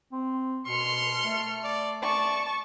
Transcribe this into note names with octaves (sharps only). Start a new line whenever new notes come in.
C4
B2 C6 F6 C#7
A3
D5
D5 A5 C#6